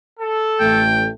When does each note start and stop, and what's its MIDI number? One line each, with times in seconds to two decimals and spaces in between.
0.19 0.84 69
0.60 1.09 33
0.60 1.09 57
0.60 1.07 79